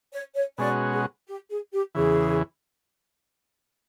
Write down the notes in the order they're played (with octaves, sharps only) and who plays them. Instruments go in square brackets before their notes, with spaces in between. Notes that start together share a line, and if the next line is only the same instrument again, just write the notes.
[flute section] C#5
C#5
[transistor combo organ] B2 G#3 C#4 F#4 [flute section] D5
[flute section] G#4
G4
G#4
G4
[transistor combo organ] E2 C#3 E3 [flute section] G#4